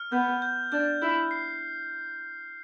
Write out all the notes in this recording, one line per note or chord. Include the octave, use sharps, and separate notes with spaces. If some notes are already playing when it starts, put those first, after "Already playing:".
Already playing: F6
B3 G6
G6
D4 G6
E4 G6
C7